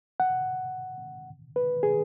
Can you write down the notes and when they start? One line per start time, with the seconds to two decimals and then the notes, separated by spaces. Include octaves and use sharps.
0.20 F#5
1.56 B4
1.83 G#4